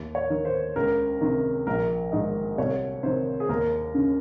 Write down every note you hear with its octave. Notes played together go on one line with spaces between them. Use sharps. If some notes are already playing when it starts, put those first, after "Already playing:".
Already playing: D#2
C#5
D#3
C5
C#2 A#4
C3 D#3
A#1 A#4
G#2 D#3 D#5
C2 C#5
C3 D#3 C5
G#4
D#2 A#4
C#3